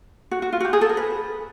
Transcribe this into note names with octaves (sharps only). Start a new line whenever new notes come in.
F#4
F#4
F4
F#4
G4
G#4
A4
A#4
B4